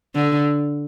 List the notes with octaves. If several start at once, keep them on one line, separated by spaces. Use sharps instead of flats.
D3